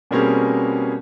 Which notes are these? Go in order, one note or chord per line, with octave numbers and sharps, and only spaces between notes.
B2 G3 A#3 C4 C#4 G#4